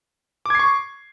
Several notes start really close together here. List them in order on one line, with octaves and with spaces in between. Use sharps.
D6 G#6 C7 C#6